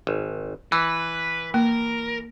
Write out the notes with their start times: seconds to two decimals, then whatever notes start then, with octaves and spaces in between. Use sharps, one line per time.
0.07 G#1
0.72 E3 B4
1.54 A#3 A#4